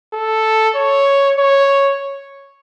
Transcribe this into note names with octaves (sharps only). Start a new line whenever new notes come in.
A4
C#5
C#5